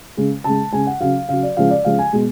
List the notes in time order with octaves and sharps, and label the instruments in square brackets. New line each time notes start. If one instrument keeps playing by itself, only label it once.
[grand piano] C#3 G#3
C#3 G#3 A5
C#3 G#3 G#5
F#5
C#3 F#3 F5
C#3 F#3 F5
D5
C#3 F3 G#3 F5
D5
C#3 F3 G#3 F5
G#5
B2 G#3